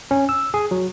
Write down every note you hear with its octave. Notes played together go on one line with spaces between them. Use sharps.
C#4
E6
G#4
F#3